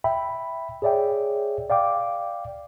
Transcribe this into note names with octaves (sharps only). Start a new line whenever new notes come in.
E5 G5 B5
G#4 C#5 D5 E5 G5
D5 F5 G5 D6